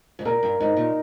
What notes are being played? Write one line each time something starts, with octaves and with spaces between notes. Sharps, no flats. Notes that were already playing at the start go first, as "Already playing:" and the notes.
G#2
A#2 A#4
G2
G#2 D#4
A#2